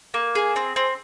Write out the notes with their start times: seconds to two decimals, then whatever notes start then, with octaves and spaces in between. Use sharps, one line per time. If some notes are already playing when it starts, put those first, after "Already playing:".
0.14 A#3
0.35 G#4
0.56 C4
0.76 C4